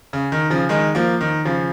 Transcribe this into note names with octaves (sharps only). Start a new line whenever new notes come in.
C#3
D#3
C#3 F3
D#3 G#3
F3 A#3
D#3
C#3 F3